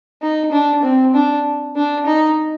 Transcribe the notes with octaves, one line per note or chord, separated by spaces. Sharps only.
D#4
D4
C4
D4
D4
D#4